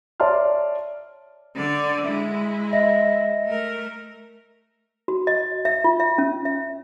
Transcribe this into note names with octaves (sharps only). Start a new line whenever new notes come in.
C#5 D5 E5 A5 C6 F6
D3 D5
G#3 E4 E5
D#5 E5 A#6
A3 A#4
F#4
D#5
E5
F4
E5
C#4
E5